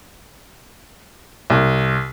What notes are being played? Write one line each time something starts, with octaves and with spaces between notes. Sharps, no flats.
C2